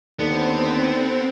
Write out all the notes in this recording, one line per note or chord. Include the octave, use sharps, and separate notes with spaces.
D#2 D3 B3 C4